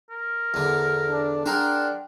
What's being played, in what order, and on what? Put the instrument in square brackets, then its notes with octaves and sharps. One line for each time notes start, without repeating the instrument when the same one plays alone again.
[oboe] A#4
[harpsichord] E2 D3
[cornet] D4
[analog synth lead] D4 [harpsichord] G#4 A#4 C5 [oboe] F#5 [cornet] G5